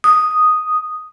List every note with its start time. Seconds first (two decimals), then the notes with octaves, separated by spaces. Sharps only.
0.04 D#6